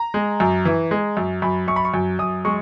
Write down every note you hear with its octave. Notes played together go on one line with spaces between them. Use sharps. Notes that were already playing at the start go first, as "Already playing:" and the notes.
Already playing: A#5
G#3
F#2
E3
G#3
F#2
F#2 B5
F#2 C#6
B5
C#6
F#2
F#2 D#6
G#3 C#6